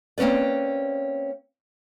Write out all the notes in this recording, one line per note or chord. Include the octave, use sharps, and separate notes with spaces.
A#3 C4 C#4 B4 D5